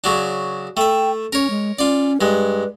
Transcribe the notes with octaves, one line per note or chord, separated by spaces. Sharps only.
C#3 F#3 D4
A3 E5 G5
C#4 A#4 C#5
G#3
C#4 F4 D5
G2 G#3 B4